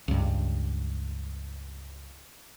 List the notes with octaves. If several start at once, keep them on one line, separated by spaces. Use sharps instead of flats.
C#2 G2